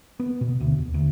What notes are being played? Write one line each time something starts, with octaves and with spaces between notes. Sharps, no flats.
B3
B2
D2
D#2
D2